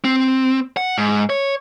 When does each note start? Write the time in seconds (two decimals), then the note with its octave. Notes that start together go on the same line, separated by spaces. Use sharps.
0.04 C4
0.77 F#5
0.98 G#2
1.30 C#5